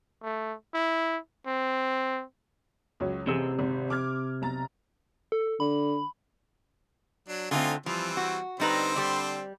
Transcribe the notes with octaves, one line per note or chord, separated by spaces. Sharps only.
A3
E4
C4
C#2 F#3 C#5
A1 C3 G#4 E6
G#1
D6 F6 G#6
B1 A#5 A6
A4
D3 B5
F#3 D4
D3 A3 C4 D#4 F4 G#5
E3 F3 G3 C4
F#4
D3 G3 C4 D#4 B4 C5
G3 D5